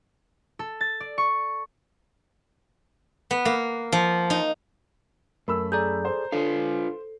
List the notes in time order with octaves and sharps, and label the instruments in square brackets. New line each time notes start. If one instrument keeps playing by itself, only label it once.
[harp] A4
A6
D5
C#6
[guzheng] B3
A#3
F3
D#4
[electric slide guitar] F#2 [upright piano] A3 B5 E6 [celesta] A#4
[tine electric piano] G#4 A4 D5 [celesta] A#5 G6
[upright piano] C5
[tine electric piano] D4 [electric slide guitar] F4 B4 F5 [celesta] A4